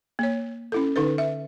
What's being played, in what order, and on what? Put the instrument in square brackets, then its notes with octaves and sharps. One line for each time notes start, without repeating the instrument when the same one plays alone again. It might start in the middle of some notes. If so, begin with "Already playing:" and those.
[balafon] A#3 C#5
C#4 E4 A4
D3 D#4 A4 B4
E5